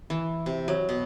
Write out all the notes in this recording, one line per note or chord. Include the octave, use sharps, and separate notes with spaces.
E3
C3
F#3
B2